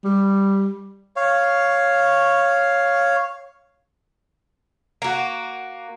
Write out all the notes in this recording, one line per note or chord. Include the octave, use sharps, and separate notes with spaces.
G3
C#5 F5
A#3 F#4